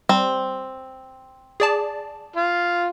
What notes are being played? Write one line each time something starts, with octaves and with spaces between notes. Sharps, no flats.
G3 C4
G#4 D5 A5
F4